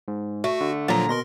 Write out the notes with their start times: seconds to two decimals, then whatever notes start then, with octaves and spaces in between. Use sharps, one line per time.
0.08 G#2
0.44 A3 F#4
0.61 D3
0.88 A#2 F3 F#3 F4 A#5
1.09 B2 A#4 C6 A#6